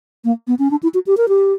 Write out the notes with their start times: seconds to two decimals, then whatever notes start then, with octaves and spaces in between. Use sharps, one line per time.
0.24 A#3
0.48 B3
0.59 C#4
0.71 D4
0.83 E4
0.94 F#4
1.07 G4
1.17 A#4
1.28 G4